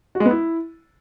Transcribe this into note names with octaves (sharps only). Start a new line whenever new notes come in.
F#4
G#3
B3
E4